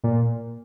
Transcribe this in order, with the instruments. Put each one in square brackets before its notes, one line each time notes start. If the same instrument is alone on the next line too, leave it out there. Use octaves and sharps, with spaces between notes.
[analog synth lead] A#2